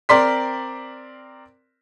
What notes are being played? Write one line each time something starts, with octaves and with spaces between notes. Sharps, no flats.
C4 A#4 D5 C6 B6